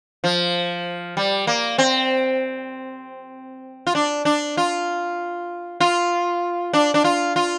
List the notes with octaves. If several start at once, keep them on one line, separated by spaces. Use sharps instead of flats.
F3
G3
A#3
C4
F4
D4
D4
F4
F4
D4
D4
F4
F4